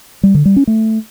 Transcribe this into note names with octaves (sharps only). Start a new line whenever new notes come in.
G3
D3
G3
C#4
A3